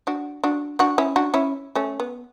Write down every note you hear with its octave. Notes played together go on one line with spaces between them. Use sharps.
D4 F#4
D4 F#4
D4 F#4
C#4 E4
D4 F#4
C#4 E4
A3 C#4
B3